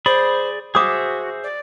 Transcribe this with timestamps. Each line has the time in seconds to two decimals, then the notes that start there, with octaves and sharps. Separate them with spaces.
0.06 G#4 C5 D5 B5
0.75 F#4 G#4 C5 E5 D6 D#6
1.44 D5